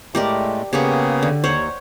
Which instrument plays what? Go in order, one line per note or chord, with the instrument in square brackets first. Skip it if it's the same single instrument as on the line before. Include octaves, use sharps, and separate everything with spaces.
[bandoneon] A2 G#3 A3 [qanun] G4 A#4 D5
[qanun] C#3 G4 C#5 [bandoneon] A#3 B3 G#4
[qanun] D3
[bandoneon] D#2 [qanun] C5 C#5 F#5